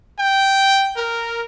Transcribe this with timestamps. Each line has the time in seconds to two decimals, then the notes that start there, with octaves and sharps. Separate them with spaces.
0.18 G5
0.97 A#4